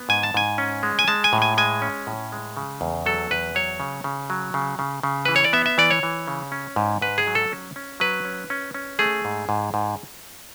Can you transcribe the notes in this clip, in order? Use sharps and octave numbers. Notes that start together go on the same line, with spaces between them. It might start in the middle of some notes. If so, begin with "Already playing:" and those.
Already playing: B3
G#2 G#5
A5
G#2 G#5
C#4
G#3
G#5
G#3 A5
G#5
A2
G#5
G#3 G#5
C#4
A2
G#3
C#3
E2
F#3 A4
E2 B4
F#3 C#5
C#3
C#3
F#3
C#3
C#3
C#3
E3 B4
C#5
D5
B3 E5
E5
E3 D5
C#5
E3
C#3
C#4
G#2
G#2 B4
G#4
F#3
A4
C#4
C#4
F#3 B4
C#4
C#4
C#4
A3 G#4
G#2
G#2
G#2